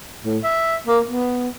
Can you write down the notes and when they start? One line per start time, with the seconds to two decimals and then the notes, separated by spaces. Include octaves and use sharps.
0.25 A2
0.43 E5
0.88 A#3
1.08 B3